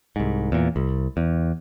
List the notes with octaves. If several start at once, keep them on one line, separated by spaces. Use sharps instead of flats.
C2 G#2
E2 A#2
C2
E2